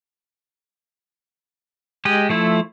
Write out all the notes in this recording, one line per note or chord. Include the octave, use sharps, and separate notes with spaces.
G#3 G4 D#5
F3 A3 E4